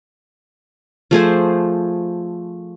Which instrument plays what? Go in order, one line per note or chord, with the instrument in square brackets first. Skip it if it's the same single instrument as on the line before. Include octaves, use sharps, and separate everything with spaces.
[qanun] F3 A3 G#4 C5